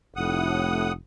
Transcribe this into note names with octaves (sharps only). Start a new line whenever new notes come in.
F1 A2 F#5 D#6